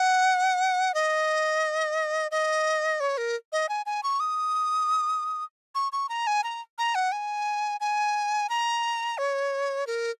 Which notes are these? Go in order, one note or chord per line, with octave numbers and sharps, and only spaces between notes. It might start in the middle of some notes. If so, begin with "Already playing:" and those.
Already playing: F#5
D#5
D#5
C#5
A#4
D#5
G#5
G#5
C#6
D#6
C#6
C#6
A#5
G#5
A#5
A#5
F#5
G#5
G#5
A#5
C#5
A#4